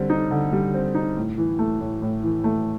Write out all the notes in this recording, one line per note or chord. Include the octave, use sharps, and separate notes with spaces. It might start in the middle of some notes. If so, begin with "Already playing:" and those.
Already playing: D3 G3 C4
D#4
D3
G3
C4
D#4
A2
E3
A3
A2
A2
E3
A3